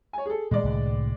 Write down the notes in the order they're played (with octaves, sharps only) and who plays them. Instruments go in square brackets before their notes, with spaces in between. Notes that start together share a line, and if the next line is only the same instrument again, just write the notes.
[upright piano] C#5 G#5
G#4 A4
[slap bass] A#2 D#3 G3 [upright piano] G#3 D5
[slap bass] C2 A2 D3